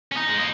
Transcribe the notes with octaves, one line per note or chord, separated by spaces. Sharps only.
C#4
D#4
G#3
A#3